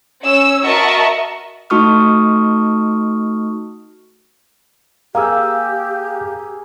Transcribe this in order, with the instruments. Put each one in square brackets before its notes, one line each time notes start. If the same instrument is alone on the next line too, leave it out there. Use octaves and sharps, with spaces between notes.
[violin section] C#4 E6
F#4 A#4 D#5 E5 A5 C#6
[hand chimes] A3 D#4 F#4 C#6 D#6 F6
[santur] A#3 G#4 E6 [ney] G4 [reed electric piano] F5